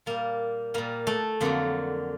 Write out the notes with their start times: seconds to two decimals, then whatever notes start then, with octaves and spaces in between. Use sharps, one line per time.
0.06 A#2 G3 A#3
0.74 A#2 G3 A#3
1.07 A3
1.41 F2 D3 F#3 A#3